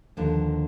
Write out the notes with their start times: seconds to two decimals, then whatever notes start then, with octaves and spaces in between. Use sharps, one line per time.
0.17 D#2 D3 F3